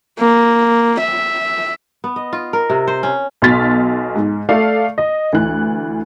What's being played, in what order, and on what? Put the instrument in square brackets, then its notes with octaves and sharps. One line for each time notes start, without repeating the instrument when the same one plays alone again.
[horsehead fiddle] A#3
E5
[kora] B3
D#5
F4
A#4
C3
C5
C#4
[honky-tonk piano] B1 B2 C6 F6 A6 B6
G#2
A3 A4 D5 F5
D#5
D2 E3 F#6